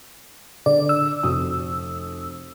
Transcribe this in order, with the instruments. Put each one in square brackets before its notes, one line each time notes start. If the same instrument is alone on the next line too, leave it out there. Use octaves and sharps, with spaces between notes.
[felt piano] D3 [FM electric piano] D5
[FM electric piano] E6
[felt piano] F1 F#4 D#6